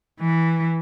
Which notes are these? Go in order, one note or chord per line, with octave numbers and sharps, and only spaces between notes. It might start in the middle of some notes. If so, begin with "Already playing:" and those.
E3